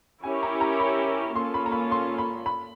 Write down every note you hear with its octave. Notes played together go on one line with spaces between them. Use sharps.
C#4 E4 G4 A#4 C#5 G#5
A#5
A#5
B5
A#3 C#4 F4 A4 C6
B5
A#5
B5
C6
B5
B5